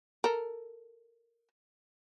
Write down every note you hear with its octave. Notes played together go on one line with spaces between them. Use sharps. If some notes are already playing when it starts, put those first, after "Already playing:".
A4 A#4